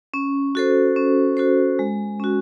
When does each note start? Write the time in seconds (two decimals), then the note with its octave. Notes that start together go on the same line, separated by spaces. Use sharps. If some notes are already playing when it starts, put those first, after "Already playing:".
0.14 C#4
0.55 F#4 A4 C5
0.96 C#4
1.37 F#4 A4 C5
1.79 G#3
2.20 C#4 F#4